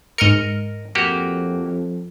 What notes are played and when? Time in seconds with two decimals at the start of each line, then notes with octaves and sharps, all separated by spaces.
0.18 G#2 A#4 D#5 F6 C#7
0.95 F2 A#3 F#4 G4